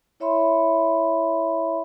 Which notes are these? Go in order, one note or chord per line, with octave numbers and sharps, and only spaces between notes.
E4 C#5 E5 B5 C6